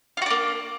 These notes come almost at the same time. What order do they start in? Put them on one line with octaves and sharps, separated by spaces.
F4 F#4 D4 A#3